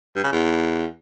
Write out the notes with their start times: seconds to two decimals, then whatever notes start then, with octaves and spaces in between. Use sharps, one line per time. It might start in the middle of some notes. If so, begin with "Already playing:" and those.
0.16 G2
0.24 C#3
0.32 E2